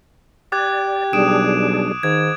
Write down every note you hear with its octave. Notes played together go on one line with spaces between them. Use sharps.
G4 D5 D6 F#6 G#6
B1 G3 D4 G#4 D#6 D7 E7
G#2 D#3 G#6